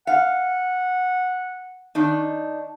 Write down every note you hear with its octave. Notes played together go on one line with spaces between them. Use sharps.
F5 F#5
D#3 D4 D#4